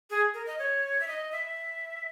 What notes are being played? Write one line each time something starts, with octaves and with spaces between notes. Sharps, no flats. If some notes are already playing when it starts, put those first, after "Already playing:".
G#4
A#4
D#5
C#5
E5
D#5
E5